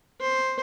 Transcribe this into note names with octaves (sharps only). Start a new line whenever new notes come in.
C5